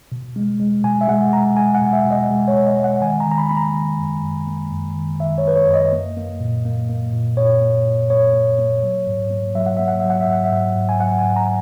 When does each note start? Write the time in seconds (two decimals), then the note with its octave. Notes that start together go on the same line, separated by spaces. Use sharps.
0.12 B2
0.36 G#3
0.60 G#3
0.84 B2 G#5
1.01 E5
1.08 G#3 F#5
1.32 G#3 A#5
1.57 G#3 G#5
1.75 F#5
1.81 B2
1.93 E5
2.05 B2
2.11 D#5
2.30 G#3
2.48 C#5
2.53 B2
2.66 D#5
2.78 G#3
2.84 F#5
3.01 D#3 G#5
3.20 A#5
3.26 D#3
3.31 A#5
3.38 B5
3.49 A#3 B5
3.57 A#5
3.74 D#3
3.98 F#2
4.23 F#2
4.47 A#3
4.71 F#2
4.96 D#3
5.19 D#3 E5
5.38 C#5
5.44 A#3 B4
5.56 C#5
5.67 F#2
5.74 D#5
5.93 A#3
6.17 A#3
6.41 A#2
6.65 A#3
6.89 A#3
7.13 A#2
7.37 A#2 C#5
7.62 A#3
7.85 A#2
8.10 A#3 C#5
8.34 A#3
8.59 A#3
8.83 F#3
9.07 G#2
9.31 A#3
9.55 F#3 E5
9.66 F#5
9.77 A#3 E5
9.88 F#5
10.00 F#3 E5
10.10 F#5
10.21 E5
10.28 G#2 F#5
10.44 E5
10.52 G#2
10.76 G#2
10.89 G#5
11.00 F#3 F#5
11.18 G#5
11.24 G#2
11.36 A#5